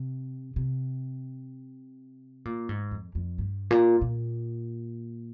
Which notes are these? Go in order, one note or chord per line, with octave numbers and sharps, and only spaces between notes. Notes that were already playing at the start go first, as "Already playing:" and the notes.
Already playing: C3
C3
A#2
G#2
F2
F2
G2
A#2
A#2